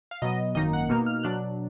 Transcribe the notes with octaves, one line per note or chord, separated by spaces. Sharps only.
F5
B2 F#3 B3 D#5
G#1 F#2 D#3 A#3 D#4 D#5
F#5
B2 A#3 D#4 F6
F6
B2 F#3 D4 F#6